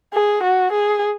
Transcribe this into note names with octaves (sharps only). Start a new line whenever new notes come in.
G#4
F#4
G#4